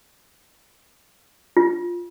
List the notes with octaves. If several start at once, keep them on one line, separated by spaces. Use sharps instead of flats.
F4